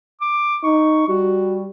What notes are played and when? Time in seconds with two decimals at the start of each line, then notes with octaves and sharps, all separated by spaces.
0.21 D6
0.63 D#4 C#6
1.08 G3 F#4